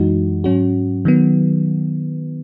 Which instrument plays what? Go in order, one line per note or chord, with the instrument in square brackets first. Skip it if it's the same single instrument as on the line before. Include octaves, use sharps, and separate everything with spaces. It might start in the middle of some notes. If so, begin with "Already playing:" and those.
Already playing: [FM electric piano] F#2 E3 G#3 D#4 F#4
G#2 F#3 C#4 F#4
D#3 F#3 B3